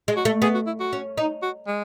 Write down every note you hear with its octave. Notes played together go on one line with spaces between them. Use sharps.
G#3
F#4
A3
B3 G#4
F#4
E4
F#4
C#4
D#4
F#4
G#3